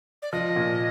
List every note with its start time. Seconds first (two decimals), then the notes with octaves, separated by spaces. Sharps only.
0.22 D5
0.32 F3 D#5
0.56 A#2